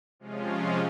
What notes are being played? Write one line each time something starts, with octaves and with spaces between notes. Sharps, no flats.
C3 F3 G#3 C#4 F4